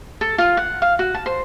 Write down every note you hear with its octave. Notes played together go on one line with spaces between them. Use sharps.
A4
F4
F#5
F5
F#4
A5
C5